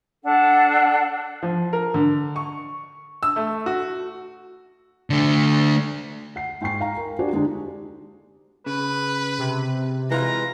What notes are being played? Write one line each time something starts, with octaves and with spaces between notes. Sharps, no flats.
D4 A4 F#5
F3
A#4
D3
C#6
E6
A3
F#4
D3 A3
F#5 C7
G#2 G5 G#5 C#6 C7
F5 G5 A#5
A#4
D4 F#4 G4 C5 D5 G#5
D3 G#3 D4 D#4 G4
C#3 B4
C3
E3 G#3 F4 A#5